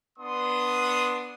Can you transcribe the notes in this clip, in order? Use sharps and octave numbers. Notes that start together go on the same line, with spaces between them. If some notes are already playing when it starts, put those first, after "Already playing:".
B3 D4 C6 D#6